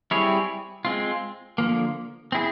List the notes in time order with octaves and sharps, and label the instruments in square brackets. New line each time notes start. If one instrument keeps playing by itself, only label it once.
[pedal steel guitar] G3 C4 E4 G#4 C#5
G#3 C4 F4
D3 F3 A#3
C4 E4 G#4